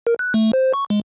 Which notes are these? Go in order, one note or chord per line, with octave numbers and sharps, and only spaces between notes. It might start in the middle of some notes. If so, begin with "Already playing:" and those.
A#4
F#6
A3
C5
C#6
G#3